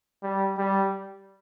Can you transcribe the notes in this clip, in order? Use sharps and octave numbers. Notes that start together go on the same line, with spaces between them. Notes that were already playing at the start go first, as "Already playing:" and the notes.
G3
G3